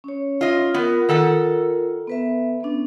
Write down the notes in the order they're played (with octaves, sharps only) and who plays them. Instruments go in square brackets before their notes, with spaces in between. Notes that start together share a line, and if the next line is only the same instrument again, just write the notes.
[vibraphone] C#4 C#5
[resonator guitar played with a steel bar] F4 D#5
[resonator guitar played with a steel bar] B3 [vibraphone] F4 A#4
[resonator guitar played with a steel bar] D#3 A4 F#5
[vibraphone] B3 B4 E5
B3 C#4 D4